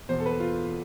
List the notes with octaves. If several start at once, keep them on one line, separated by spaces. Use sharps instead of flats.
E2 B2 C5
A4
B4
A4
F4